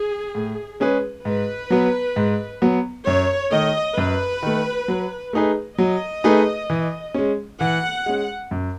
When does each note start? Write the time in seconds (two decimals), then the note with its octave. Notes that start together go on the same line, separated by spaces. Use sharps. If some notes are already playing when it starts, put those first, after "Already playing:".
Already playing: G#4
0.35 A2
0.80 G#3 C#4 G#4 B4
1.25 G#2 B4
1.70 F#3 B3
2.16 G#2
2.62 F#3 B3
3.06 F#2 C#5
3.52 D#3 A3 D#5
3.97 F#2 B4
4.43 D#3 A3
4.88 F#3
5.33 A3 D#4 G#4 B4
5.78 F#3 D#5
6.24 A3 D#4 G#4 B4
6.70 E3
7.14 G#3 C#4
7.61 E3 F#5
8.06 G#3 C#4
8.51 F#2